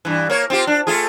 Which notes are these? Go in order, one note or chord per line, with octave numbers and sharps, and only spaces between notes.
G2 E3
A#3 C#5
C4 F4 G4
D4
A3 F4 G#4